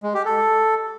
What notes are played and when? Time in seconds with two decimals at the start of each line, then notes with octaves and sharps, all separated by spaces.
0.03 G#3
0.14 G4
0.25 A4